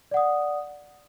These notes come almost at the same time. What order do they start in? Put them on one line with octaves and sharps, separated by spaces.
D5 F#5 D#6